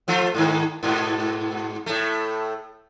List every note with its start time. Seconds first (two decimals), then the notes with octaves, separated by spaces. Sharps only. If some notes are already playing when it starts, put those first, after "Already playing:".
0.08 F3 A3 F4
0.35 G#2 D#3
0.83 G#2 B2
1.86 A2 A3